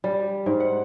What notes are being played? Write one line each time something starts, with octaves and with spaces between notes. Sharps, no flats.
G3
G#2
F#5